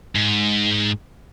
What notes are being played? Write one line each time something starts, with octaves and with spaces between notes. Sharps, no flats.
G#2